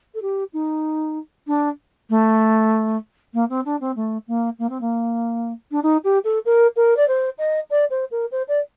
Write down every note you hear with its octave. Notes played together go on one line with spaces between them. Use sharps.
A4
G4
D#4
D4
A3
A#3
C4
D4
C4
A3
A#3
A#3
C4
A#3
D4
D#4
G4
A4
A#4
A#4
D5
C5
D#5
D5
C5
A#4
C5
D5